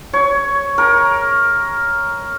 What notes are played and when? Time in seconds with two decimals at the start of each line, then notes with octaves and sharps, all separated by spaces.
0.13 C#5
0.78 A#4